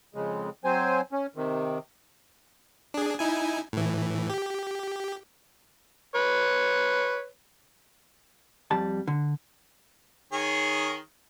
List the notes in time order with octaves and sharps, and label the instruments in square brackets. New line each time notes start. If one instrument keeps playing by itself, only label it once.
[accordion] F2 C#3 G#3
F#3 C4 C5 G#5
C#4
C3 D#3
[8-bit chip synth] D4 G#4
D#4 E4 G#5
A2 E3
G4
[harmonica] B4 C#5
[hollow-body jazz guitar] F2 G3 A5
D3
[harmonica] D#3 G#4 C#5